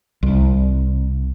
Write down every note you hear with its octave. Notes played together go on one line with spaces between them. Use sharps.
C2